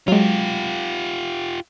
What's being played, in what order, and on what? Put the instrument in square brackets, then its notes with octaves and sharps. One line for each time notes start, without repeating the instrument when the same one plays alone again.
[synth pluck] F#3 G#3 [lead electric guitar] F4 G4